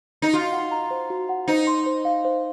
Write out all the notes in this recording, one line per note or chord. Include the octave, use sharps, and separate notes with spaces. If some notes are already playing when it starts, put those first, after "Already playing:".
D#4
F4 F#4
F#5
A#5
C5
F#4
F#5
D#4 C5
C6
C5
F5
C5